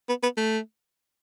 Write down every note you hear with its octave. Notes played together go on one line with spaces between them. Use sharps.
B3
B3
A3